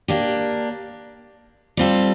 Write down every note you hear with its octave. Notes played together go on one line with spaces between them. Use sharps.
A#3 D4 G4
G3 C4 F4 A4